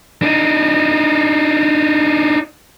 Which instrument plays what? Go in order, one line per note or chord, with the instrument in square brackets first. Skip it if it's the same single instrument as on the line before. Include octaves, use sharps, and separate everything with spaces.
[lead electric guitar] D4 D#4